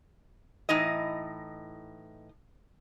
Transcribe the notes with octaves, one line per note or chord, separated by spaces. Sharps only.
A2 E3 D#4 D#5